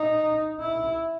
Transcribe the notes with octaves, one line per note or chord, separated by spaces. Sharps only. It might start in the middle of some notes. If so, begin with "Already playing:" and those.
Already playing: D#4
E4